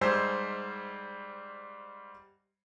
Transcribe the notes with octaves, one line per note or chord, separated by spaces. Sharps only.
G#2 G3 D#4 C5 G#5 E6